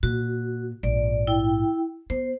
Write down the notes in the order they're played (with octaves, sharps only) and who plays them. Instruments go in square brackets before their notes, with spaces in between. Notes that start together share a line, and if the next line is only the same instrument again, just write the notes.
[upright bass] A#2 [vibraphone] F#4
[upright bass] A#1 G#2 [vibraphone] D5
[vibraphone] E4 G5
[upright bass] B3 [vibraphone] C5